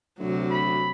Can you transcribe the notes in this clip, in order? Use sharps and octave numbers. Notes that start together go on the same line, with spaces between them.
D2 C3 F#3
B5